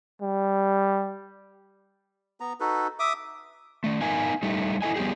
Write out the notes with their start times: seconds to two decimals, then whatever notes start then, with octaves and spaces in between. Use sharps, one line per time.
0.22 G3
2.40 B3 A#5
2.60 D#4 F#4 A4 B4
2.99 E5 D6 D#6
3.84 D#3 A3
4.02 B3 D#4 A#4 F5 G#5
4.43 G3 A3 D#4
4.82 E4 A4 D#5 G#5
4.96 G3 B3 C4 G4 G#4